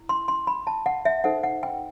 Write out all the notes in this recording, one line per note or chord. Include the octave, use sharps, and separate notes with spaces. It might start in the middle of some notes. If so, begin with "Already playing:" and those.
Already playing: E4
C6
C6
B5
A5
F#5
E5
D#4 A4 C5 F#5
F#5
G5